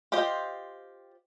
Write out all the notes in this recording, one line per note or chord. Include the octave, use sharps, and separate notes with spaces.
F4 G4 C5 D#5